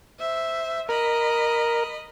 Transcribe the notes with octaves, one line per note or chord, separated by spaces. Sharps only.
C5 E5
A#4 D#5 B5